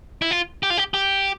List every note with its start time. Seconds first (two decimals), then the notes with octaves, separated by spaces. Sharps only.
0.22 E4
0.31 F4
0.63 G4
0.70 F4
0.77 G4
0.94 G4